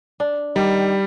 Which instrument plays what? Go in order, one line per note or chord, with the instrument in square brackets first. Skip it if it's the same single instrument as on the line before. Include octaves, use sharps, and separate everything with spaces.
[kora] D4
[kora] D#3 [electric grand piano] G3